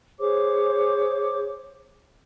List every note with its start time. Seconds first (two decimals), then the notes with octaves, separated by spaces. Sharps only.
0.19 G#4 C5 C#5 D6